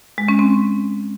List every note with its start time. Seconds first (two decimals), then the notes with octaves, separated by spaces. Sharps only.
0.18 G#3
0.28 C#4
0.39 C4